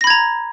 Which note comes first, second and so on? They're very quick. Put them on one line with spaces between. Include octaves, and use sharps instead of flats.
A#6 B5 G#6 A#5